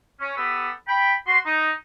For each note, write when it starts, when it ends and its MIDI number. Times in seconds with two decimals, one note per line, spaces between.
0.20 0.33 61
0.37 0.69 59
0.37 0.69 67
0.37 0.69 69
0.37 0.69 71
0.37 0.69 88
0.88 1.14 79
0.88 1.14 83
1.27 1.39 66
1.27 1.39 84
1.46 1.71 63